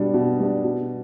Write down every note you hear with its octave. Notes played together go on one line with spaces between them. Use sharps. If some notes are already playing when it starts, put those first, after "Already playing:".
Already playing: B2 G3 D4
B2
G3 D4
B2